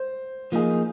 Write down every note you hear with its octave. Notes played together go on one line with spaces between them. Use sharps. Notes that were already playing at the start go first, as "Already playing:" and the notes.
Already playing: C5
F3 A#3 D#4 G#4